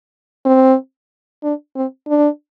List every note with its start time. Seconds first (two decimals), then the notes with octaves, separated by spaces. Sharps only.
0.45 C4
1.43 D4
1.76 C4
2.08 D4